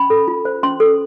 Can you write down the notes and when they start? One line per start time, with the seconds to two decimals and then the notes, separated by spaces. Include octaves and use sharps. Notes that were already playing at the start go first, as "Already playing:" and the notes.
Already playing: C#4 B5
0.10 A4
0.28 F4
0.45 C5
0.63 C#4 C6
0.80 A4